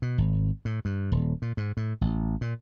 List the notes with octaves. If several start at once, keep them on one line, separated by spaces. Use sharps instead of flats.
B2
G#1
A2
G2
D#1
A#2
G#2
A2
A1
A#2